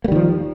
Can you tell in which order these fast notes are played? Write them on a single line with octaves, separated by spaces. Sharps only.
A#3 G3 D#3 F3